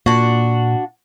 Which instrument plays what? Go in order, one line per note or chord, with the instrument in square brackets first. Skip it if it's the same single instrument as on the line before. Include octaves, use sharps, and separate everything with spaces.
[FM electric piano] A#2 [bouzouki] D4 F#4